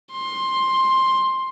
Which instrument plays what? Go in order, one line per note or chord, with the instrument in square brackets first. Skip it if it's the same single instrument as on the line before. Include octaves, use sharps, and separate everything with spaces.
[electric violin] C6